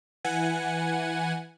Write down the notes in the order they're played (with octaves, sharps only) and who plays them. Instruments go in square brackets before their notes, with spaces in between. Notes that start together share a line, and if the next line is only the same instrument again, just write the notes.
[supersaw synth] E3 F#5 G#5